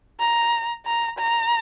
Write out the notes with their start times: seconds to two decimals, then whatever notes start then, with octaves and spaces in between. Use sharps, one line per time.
0.20 A#5
0.86 A#5
1.19 A#5